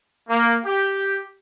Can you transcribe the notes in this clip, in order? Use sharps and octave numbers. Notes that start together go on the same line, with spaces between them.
A#3
G4